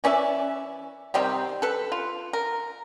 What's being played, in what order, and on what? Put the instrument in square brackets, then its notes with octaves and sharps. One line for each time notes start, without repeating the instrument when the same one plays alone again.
[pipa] E3 C#4 D5 E5
C3 D#3 G3 C4
A4 B4
F4
A#4